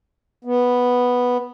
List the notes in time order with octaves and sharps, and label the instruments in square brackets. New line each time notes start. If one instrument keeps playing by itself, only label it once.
[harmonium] B3